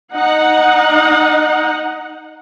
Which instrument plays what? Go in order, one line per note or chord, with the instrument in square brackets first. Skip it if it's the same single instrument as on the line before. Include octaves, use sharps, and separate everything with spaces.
[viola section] D#4 F#5